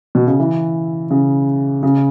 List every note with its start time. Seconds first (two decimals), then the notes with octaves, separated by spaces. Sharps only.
0.15 B2
0.27 C#3
0.40 E3
1.11 C#3
1.83 C#3